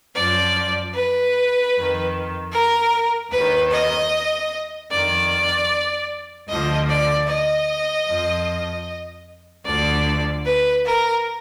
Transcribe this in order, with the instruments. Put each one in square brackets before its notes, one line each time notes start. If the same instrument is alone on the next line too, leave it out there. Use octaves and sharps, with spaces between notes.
[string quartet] F#2 F3 D5
B4
F2 D#3
A#4
D#2 D#3 B4
D#5
F2 D#3 D5
D2 D3 F3 D#5
D5
D#5
F2 F3
D2 D3 F3 D5
B4
A#4